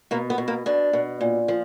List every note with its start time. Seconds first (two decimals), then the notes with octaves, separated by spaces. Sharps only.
0.11 B2 A#3
0.30 B3
0.38 B2
0.48 A#3
0.66 B2 D4
0.93 B2
1.21 A#2
1.48 F3